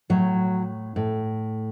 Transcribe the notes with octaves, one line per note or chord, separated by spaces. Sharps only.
A2 F#3
A2